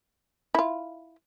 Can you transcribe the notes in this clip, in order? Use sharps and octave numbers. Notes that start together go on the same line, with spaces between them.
E4 F4